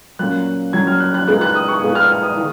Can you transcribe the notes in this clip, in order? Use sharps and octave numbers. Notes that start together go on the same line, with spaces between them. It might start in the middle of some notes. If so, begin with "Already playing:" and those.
A#2 F#3 A#3 C#4 F#6
A#2 F#3 A#3 C#4 G#6
F6
F#6
F#6
A#2 G#3 B3 D#4 F#6
F#6
D#6
C#6
A#2 G#3 B3 D#4 D#6
F6
F6
D#6
D#3